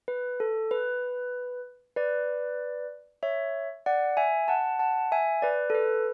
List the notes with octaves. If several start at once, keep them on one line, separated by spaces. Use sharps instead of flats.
B4
A4
B4
B4 D5
C#5 E5
D5 F#5
E5 G#5
F#5 A5
F#5 A5
E5 G#5
B4 D5
A4
B4